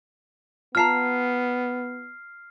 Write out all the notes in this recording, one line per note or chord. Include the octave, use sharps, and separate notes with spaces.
B3 F4 A5 A#5 F6 C7